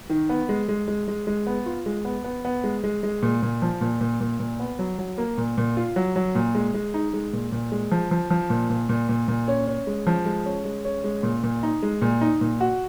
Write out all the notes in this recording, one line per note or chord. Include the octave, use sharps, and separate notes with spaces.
D#3
B3
G#3
G#3
G#3
G#3
G#3
B3
F4
G#3
B3
B3
B3
G#3
G#3
G#3
A#2
A#2
F3
A#2
A#2
A#2
A#2
B3
F#3
F#3
A#3
A#2
A#2
F4
F#3
F#3
A#2
G#3
G#3
D#4
G#3
A#2
A#2
G#3
F3
F3
F3
A#2
A#2
A#2
A#2
A#2
C#4
C#4
G#3
F3
G#3
C#4
G#3
C#4
G#3
A#2
A#2
D#4
G#3
A#2
D#4
A#2
F#4